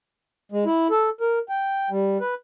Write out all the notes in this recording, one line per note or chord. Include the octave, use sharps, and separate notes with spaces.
G#3
E4
A4
A#4
G5
G3
B4